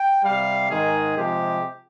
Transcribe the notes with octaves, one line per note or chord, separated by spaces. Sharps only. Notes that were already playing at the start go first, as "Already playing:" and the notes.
Already playing: G5
C3 G3 F5
G#2 D#3 G#3 G#4
C3 F3 G#3 G4